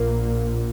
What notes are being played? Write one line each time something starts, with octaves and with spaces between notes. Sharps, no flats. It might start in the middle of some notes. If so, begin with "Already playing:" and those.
Already playing: A#1 A#2 A#3